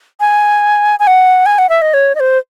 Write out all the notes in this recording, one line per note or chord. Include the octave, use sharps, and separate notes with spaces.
G#5
G#5
F#5
G#5
F#5
E5
D#5
C#5
D#5
C5